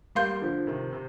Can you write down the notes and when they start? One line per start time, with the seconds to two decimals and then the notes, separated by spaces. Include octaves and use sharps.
0.15 G3 A#3 F5 C6 G6
0.41 D3 F3
0.67 C3 D#3
0.93 C3